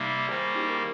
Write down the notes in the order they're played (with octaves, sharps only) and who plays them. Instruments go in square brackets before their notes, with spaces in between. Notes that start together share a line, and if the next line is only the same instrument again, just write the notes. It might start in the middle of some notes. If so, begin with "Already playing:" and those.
Already playing: [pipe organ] C3 G3 A#3 [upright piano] D#4
[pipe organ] D#3 G3 A#3 [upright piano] G#4 C5
[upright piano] D#4 G4
G4 A#4